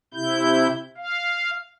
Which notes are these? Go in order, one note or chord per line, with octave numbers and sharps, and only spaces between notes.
C3 E4 G6
F5